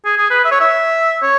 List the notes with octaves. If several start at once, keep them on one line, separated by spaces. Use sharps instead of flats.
G#4
G#4
B4
E5
C#5
E5
C#5